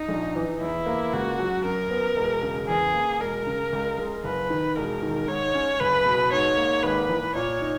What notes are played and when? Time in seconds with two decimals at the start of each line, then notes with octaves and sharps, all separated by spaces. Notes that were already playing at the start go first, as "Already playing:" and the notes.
Already playing: D#4
0.08 A#1
0.35 E3
0.61 E2 E4
0.86 A#3
1.13 C#2 F#4
1.39 F#3
1.65 F#2 A#4
1.90 B3
2.16 E1
2.43 C#3
2.68 E2 G#4
2.94 A#3
3.20 E1 A#4
3.47 C#3
3.73 C#2
3.98 G#3
4.24 F#1 B4
4.50 D#3
4.75 E1 A#4
5.03 D#3
5.28 G#2 C#5
5.54 C#4
5.80 F#1 B4
6.06 B2
6.32 G#2 C#5
6.57 A#3
6.83 G#1 B4
7.09 E3
7.35 A#2 C#5
7.61 D#4